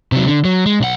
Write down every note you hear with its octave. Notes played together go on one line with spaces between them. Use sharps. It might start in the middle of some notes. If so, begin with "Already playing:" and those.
C3 F#3
D3
F#3
G#3
B1 F#5